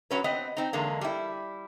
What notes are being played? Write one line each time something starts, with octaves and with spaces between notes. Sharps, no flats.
F#3 C#4 B4
B3 C4 D#5
C4 D#4
E2 D3 G#3 A#3
G3 E4